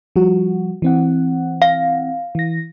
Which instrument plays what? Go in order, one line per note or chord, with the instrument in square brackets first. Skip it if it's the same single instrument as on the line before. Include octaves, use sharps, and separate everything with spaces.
[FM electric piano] F3 G3 F#4
E3 C4 F#5
[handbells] F5
[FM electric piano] E3 A#6